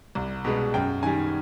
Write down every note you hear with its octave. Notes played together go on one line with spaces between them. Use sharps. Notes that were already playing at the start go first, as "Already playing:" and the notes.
C2
B2 G#3 B3
F#2 G5
D#3 G3 G#5